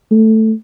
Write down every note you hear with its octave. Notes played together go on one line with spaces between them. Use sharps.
A3